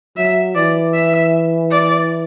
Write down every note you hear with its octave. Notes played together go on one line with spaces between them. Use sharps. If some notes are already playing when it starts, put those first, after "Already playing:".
F#3 E5
E3 D5
E5
D5